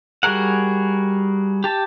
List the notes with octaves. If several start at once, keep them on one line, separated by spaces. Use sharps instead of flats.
G3 F#4 G#4 A#4 F#5
G4 A5